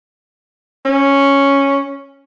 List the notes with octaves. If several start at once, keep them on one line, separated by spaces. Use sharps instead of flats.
C#4